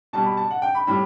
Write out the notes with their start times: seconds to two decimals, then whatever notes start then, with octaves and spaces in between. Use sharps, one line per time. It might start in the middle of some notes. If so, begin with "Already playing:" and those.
0.13 B2 G3 A5
0.25 B5
0.37 A5
0.51 F#5
0.62 G5
0.75 B5
0.87 A2 G3 B5